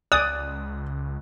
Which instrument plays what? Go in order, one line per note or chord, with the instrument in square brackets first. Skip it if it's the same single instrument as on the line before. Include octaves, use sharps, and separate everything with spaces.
[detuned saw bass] C#2 [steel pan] D5 G#5 [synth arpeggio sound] D#6 [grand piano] F#6